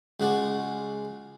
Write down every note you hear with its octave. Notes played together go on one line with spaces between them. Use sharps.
C#2 G#3 F#4 D5